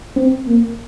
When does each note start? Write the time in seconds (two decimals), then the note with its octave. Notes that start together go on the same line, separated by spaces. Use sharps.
0.16 C4
0.47 A#3